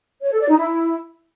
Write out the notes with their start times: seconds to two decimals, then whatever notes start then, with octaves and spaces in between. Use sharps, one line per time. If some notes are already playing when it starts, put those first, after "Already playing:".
0.23 C#5
0.31 A4
0.40 D5
0.49 D#4
0.57 E4